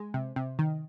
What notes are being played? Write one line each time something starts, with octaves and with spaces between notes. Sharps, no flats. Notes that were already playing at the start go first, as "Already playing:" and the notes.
Already playing: G#3
C3
C3
D#3